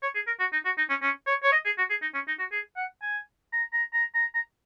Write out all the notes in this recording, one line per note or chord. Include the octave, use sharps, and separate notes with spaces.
C#5
G#4
A#4
F#4
D#4
F#4
D#4
C#4
C#4
C#5
C#5
D#5
G#4
F#4
G#4
D#4
C#4
D#4
F#4
G#4
F#5
G#5
A#5
A#5
A#5
A#5
A#5